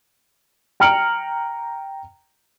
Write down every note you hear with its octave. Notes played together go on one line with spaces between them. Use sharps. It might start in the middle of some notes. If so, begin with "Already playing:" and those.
G5 A#5 F6 C#7 D7 F#7